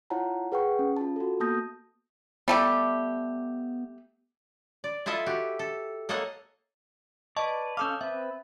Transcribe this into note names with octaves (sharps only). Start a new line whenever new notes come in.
E4 F4 C#5 F#5 A5 A#5
G#4 B4 F#5 G5 C#6
C#4
F4 A5
F#4 A4
A#3 B3 A5 D#6 G6 A#6
G3 A3 B3 G4
D5
E4 F4 A4 D#5 E5
F#4 G4
A4
A#3 A4 C#5 D#5 F#5
B4 D5 D#5 A5 C#6
C#4 A4 F5 D6 D#6 G6
C4 B4 E5